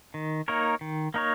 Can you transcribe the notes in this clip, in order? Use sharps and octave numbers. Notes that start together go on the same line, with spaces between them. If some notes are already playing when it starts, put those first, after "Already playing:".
D#3
A#3 D#4 A#4 C#5
D#3
A#3 D#4 A#4 C#5